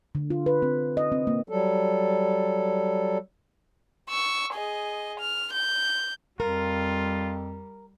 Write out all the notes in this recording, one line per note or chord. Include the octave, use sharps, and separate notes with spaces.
D3
F4
B4
C4
D#5
C4
A#3
F#3 G3 A4
C#6 E6
G#4 D#5
F6
G6
F2 G3 F4 A#4